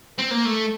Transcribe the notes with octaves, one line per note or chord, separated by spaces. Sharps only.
C4
A#3
A3